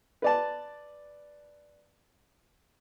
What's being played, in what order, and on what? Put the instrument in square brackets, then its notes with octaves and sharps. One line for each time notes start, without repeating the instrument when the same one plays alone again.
[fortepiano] B4 D5 A5